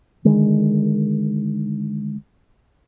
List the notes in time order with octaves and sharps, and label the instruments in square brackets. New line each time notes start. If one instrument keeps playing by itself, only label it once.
[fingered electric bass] D3 D#3 G#3